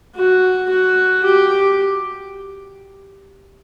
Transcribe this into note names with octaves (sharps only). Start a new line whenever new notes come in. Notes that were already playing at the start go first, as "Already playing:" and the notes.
F#4
F#4
G4